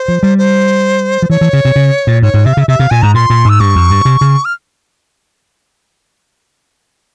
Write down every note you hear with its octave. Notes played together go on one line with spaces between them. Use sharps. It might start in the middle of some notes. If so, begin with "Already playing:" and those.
Already playing: C5
F3
G3
C5
F3
E3 C#5
E3
C#3
C3
C#3
A#2
G#2 C#5
G#2
C3 E5
F5
C#3 E5
C3 E5
C3 F5
A#2 G#5
G#2 A#5
A#2 C6
A#2
G#2 E6
G2 C#6
F2
G2
C3
C#3
F6